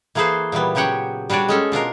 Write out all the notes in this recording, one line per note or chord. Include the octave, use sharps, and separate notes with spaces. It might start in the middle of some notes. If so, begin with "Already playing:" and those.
E3 A#3 G#4 A4 B4 C5
A#2 E3 G3 B3
C#3 F#3 G4 C#5 F#5 G5
G3 D4 F#4 C#5 D5
G#3 C#4 A4
B2 D4 F4 A#4